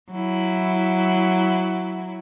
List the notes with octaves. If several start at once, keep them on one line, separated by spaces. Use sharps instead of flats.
F#3 E4